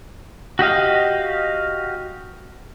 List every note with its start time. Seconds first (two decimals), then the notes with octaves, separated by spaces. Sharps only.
0.59 F#4 G4 D#5 F5